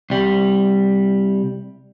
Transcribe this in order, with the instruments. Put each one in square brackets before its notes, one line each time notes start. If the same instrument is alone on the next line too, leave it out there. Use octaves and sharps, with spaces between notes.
[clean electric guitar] C2 G3